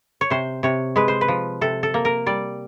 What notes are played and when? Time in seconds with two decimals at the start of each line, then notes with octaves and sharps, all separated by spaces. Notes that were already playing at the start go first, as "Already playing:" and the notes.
0.21 C#5
0.30 C3 C5
0.63 C3 C#5
0.96 G#3 B4
1.08 C5
1.21 B4
1.28 F3
1.61 C3 A4
1.83 A4
1.94 A#3
2.05 A#4
2.26 G3 D5